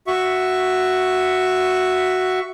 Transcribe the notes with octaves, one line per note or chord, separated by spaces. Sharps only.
F#4 E5 C#6